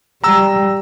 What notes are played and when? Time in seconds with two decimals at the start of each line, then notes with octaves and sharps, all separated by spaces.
0.24 G3 A#5 E6